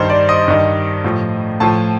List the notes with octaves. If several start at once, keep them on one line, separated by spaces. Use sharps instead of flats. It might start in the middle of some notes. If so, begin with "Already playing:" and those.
Already playing: G2 D#3 C5
D5
D#5
G2 D#3
A2 F3
A2 F3 A5